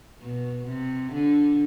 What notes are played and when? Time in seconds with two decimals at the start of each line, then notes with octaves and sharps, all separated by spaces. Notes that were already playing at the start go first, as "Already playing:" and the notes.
0.22 B2
0.68 C3
1.13 D3